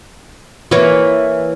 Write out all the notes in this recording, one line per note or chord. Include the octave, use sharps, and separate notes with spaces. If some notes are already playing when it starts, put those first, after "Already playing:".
E3 A#3 C#5